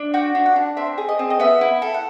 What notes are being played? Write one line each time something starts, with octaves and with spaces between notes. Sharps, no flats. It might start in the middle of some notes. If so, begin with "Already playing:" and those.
Already playing: D4
F#4 G5
D4
F#5
D4
C4 E5
G#4
D#5
C4
D#5
B3 E5
E4
A4
F#5